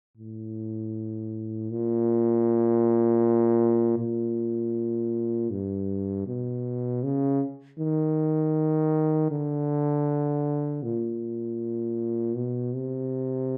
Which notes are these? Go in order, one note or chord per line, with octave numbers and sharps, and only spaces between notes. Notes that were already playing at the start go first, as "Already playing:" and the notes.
A2
A#2
A#2
G2
B2
C#3
D#3
D3
A#2
B2
C3